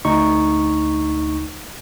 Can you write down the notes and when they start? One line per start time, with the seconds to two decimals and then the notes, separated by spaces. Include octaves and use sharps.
0.05 D2 D#4 C#6